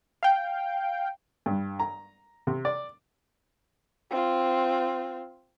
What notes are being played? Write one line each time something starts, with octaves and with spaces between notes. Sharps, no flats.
F5 G5
G2
A#5
C3
D5
C4 F4